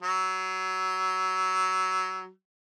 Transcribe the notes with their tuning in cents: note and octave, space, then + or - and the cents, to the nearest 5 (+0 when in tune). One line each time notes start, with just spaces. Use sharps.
F#3 +20